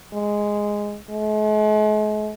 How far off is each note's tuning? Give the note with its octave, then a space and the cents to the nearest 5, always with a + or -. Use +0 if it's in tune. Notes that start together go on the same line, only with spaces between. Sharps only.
G#3 -5
G#3 +45